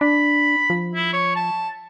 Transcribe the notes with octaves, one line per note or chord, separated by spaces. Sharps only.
D4 B5
F3
E4
C#5
A5